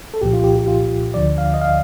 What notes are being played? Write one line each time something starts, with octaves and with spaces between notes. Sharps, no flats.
A4
C2 A#2 F3 G4
F4
G4
G4
F4
D2 D3 F3 D5
F5
D#5
F5